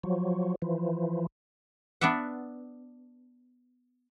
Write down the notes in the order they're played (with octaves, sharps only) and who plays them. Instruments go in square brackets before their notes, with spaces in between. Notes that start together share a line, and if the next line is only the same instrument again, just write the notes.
[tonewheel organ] F3 F#3
E3 F3
[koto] B3 D4 D5 E5 F#5